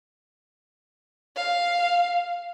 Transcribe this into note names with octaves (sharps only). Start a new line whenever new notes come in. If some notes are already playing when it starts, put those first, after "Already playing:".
F5